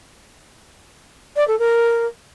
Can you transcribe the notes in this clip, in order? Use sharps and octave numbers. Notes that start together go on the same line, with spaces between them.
D5
A4
A#4